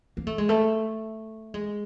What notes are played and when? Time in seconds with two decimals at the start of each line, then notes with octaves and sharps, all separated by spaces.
0.17 A#3
0.27 A3
0.38 G#3
0.49 A3
1.54 G#3